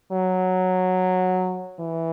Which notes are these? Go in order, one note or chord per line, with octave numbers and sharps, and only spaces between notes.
F#3
E3